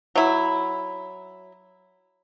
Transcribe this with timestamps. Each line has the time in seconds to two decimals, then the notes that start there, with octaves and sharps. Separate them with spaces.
0.16 F#3 E4